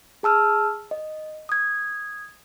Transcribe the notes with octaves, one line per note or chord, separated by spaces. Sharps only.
G#4 A5 E6 F6
D#5
D#6 G#6